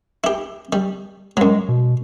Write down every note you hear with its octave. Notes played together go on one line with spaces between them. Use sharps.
E4 G4
G3
F#2 F#3 G#3
B2